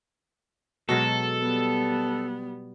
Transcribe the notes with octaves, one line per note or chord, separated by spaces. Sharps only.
B2 F#3 G#3 A4
G3 B3